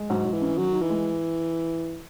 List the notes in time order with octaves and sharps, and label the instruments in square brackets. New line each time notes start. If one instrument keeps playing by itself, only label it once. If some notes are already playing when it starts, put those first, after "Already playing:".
Already playing: [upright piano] G#3
[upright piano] G#2 [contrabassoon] F#3
[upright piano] G#2
[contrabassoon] E3
[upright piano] C#4
[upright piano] D#3 [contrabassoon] F#3
[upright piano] D#4
[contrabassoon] E3
[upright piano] G#3